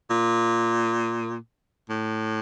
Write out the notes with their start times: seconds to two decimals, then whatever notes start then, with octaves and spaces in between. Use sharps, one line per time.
0.10 A#2
1.89 A2